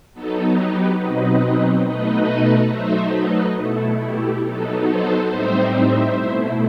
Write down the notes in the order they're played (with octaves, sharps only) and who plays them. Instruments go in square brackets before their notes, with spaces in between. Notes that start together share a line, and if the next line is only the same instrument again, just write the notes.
[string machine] F#3 B3 D#4 A4
G4 B4
B2 F#3 C4 D#4 B4 D#5
B2 A3 D#4 B4 D#5
F#3 A3 D#4 C5 E5
B4 D#5
B2 A3 E4 A4
G4
F#3 B3 D#4 A4
A4 C5
A2 G3 C4 D#4 C5 E5
C5 E5
B2 A3 E4